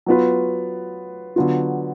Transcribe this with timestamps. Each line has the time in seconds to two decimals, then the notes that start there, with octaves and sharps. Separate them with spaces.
0.06 F#3 B3 F4 B4
1.36 D3 F#3 B3 F4